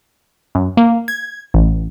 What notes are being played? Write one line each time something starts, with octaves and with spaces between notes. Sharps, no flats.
F#2
A#3
G#6
A1